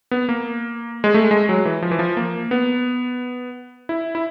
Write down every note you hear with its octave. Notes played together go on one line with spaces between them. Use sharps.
B3
A#3
G#3
A3
G#3
F#3
E3
F3
E3
F3
A#3
B3
E4
E4